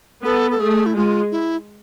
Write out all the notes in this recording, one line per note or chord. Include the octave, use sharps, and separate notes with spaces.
B3 A4
A4
A3 G#4
E4
G#3 F4
E4